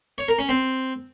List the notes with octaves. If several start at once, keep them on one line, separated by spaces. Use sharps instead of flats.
C#5
A#4
C#4
C4